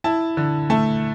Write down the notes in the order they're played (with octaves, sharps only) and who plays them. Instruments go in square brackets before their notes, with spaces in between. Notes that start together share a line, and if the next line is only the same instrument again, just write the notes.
[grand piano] E4 A5
D3
A3 A5